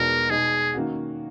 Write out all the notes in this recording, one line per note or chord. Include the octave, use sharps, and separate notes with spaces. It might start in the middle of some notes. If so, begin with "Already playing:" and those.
Already playing: E2 B2 G#3 D#4 F#4 A#4
B2 G#3 D#4 G#4
D#3 A#3 C#4 F#4